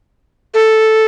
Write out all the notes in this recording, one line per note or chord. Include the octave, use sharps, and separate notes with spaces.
A4